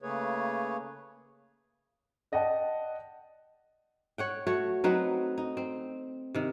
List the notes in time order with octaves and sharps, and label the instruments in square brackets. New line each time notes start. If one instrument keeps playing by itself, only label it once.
[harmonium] C#3 A3 A#3 G#4 B4 C#5
[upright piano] D5 D#5 F#5 G5 A5
[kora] C#5 F#5 G5
A3 F#4 C#5
F#3 C4 D#4 B4
D#4
C4
C3 D#3